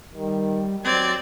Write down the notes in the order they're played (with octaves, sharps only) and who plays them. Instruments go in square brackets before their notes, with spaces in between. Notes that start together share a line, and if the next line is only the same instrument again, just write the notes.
[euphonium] D#3 [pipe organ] G3
[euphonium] F#3 [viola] C4 D5 [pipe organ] G#6